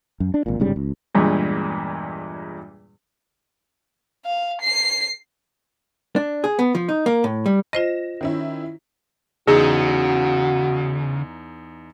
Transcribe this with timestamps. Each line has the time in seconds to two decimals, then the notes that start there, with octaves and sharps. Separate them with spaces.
0.20 F#2
0.34 D4
0.46 G#1 A#2
0.60 G1 G#2 C#3 G3
0.76 C#2
1.14 E2 G2 A#2 G#3
4.25 F5
4.61 C7
6.16 D4
6.44 G#4
6.59 B3
6.75 F3
6.89 D#4
7.06 A#3
7.24 A2
7.46 G3
7.73 F4 C5 D#5 A#6 E7
8.21 D#3 C#4 E4
9.48 E2 C#3 D#4 F#4 G#4 A#6